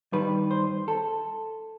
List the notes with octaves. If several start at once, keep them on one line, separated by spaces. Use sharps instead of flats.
G2 D#3 G3 B4
C5
A4